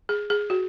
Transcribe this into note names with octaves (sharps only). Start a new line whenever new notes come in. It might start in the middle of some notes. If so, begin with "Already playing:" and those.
G#4
G#4
F#4